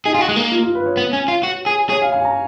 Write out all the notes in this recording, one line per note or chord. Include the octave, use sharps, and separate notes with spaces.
D#4 G#4
F4
F#4
G#3
A#3
F4
F4
B4
C#5
B3
C#4
F4
F#4
G#4
G#4 C#5
F5
G#5
A#5